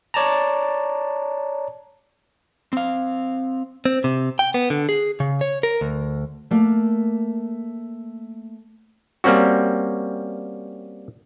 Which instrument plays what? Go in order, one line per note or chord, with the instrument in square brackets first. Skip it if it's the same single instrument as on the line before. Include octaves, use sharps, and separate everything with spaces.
[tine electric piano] C#5 D5 A5 A#5
[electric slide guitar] C4 F5
[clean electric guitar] C4
C3
G5
B3
D3
G#4
C#3
C#5
A#4
D2
[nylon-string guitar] A3 A#3
[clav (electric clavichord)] G3 A#3 C4 C#4 F#4